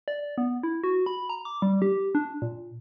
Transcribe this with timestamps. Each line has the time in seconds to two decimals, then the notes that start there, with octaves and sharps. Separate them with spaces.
0.08 D5
0.38 B3
0.63 E4
0.83 F#4
1.06 B5
1.29 A#5
1.45 D6
1.62 G3
1.82 G4
2.15 D4
2.42 A#2